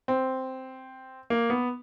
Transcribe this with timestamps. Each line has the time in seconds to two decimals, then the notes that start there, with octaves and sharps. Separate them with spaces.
0.08 C4
1.30 A#3
1.50 B3